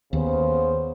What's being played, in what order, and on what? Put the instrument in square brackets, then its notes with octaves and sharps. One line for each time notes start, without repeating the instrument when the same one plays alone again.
[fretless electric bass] D#2 [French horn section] C#3 B3 C5